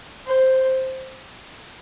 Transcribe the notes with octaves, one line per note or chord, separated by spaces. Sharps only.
C5